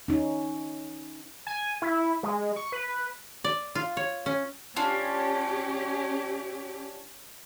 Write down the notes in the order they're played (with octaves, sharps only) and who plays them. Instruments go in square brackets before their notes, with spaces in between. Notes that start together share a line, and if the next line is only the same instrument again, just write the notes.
[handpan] C#4 D#4
[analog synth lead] G#5
E4
G#3
C#6
B4
[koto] D5
F4
C#5
C#4
[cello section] C#4 G4 [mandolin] D4 F4